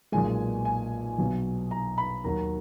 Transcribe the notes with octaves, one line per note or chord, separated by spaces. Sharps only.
B1 A#2 G#3 G#5
G#5
B1 B2 F#3
A#5
B5
D#2 D#3 F#3 A#5